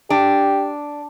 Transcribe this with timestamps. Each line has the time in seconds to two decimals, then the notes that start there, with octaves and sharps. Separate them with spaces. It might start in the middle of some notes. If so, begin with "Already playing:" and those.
0.10 D4 G4